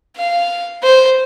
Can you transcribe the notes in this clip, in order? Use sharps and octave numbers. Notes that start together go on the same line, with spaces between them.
F5
C5